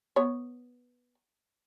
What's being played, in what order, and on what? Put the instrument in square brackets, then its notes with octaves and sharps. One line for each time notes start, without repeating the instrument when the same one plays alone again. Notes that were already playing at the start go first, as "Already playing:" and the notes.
[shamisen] B3 C#5